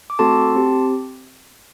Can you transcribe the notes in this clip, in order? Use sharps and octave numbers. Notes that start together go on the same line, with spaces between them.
D6
A3 C4 F#4 A4 A5 C6
C4 G4